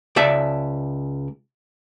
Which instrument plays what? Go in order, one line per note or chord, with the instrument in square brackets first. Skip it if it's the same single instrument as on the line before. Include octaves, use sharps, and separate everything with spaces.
[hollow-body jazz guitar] C#2 D5 E5 A5